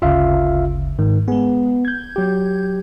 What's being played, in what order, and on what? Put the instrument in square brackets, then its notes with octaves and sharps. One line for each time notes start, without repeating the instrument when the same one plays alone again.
[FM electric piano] G1 D2 C#3 [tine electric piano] F4 E5 F5
[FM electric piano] G#2 [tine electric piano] D#3
[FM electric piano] G#3 G#4 [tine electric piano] B3
[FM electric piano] G6 G#6
[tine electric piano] F#3 G4